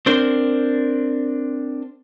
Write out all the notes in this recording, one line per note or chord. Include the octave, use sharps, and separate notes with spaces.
C4 D4 A#4 C5